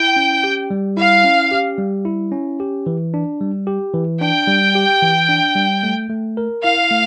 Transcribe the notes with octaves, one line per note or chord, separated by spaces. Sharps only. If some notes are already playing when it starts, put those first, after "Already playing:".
Already playing: E4 G5
C#4
G4
G3
E4 F5
C#4
G4
G3
E4
C#4
G4
E3
D4
G3
G4
E3
D4 G5
G3
G4
E3
D4
G3
A3
A3
A#4
E4 F5
A3